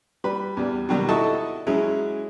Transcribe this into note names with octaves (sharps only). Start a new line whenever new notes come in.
G3 B4
E2 G3
B2 D#3 F#3 G3
E4 F#4 A4 D#5 A5 C#6
F#3 G#3 C#4 E4